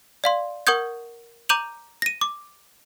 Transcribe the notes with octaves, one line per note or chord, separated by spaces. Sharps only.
D5 F5 C6
A#4 F#5 C#6 D#6 G6 G#6
A#5 D6 G6 D#7 F7 F#7
A#6 D#7
D6